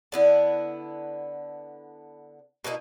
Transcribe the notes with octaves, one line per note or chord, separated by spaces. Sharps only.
D3 B3 E4
B2 A#3 D#4 E4